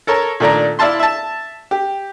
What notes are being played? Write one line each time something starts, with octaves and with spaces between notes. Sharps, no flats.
A4 A#4 C#5 A5
A#2 D#3 A3 D4 D5 A#5
E4 D5 E5 F5 A5 C6
E5 A5
G4